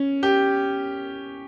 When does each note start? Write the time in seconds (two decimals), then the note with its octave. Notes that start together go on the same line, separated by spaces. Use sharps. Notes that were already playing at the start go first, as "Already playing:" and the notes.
Already playing: C#4
0.23 G4